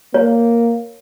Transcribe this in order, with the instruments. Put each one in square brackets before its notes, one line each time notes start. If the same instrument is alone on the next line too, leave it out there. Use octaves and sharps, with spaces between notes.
[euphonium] A#3 [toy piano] C#5